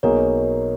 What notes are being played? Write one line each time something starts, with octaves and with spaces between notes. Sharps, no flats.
B1 B2 A#3 D#4 G#4 A#4 C#5